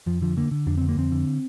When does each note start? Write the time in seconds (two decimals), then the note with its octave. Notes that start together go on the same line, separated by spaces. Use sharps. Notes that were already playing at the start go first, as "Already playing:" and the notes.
0.06 F2 F3
0.22 D3 F3
0.37 D3 A#3
0.51 D3
0.67 F2 D4
0.77 D3 C4
0.89 A#3
0.97 F2 C4
1.12 D3